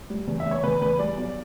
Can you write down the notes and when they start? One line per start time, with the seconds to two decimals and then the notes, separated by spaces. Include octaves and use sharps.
0.10 G3
0.27 E2
0.40 E5
0.46 E2
0.51 C#5
0.63 E2 B4
0.81 E2 B4
0.99 G3 D5
1.17 B1